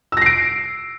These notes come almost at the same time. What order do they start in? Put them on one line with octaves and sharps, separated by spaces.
E6 A#6 C7 D7